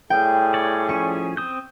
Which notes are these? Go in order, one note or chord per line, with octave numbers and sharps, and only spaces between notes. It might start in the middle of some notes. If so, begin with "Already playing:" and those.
A2 G3 G#4 G5
C#5 D5
F3 C#4 G#5 C#6
C4 D#6 G6